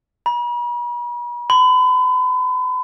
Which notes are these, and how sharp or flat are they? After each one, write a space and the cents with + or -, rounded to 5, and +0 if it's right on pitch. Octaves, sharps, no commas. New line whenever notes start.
B5 -45
B5 +40